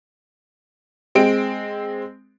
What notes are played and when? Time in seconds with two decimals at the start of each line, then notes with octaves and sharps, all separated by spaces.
1.15 G#3 C4 D7